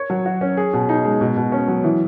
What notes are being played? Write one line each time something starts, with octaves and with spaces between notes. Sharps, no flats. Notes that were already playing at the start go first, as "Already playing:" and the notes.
Already playing: C#5
F#3
F#4
C#4
G#4
B2
D#4
G#3
B2
B2
C#4
F#3
E3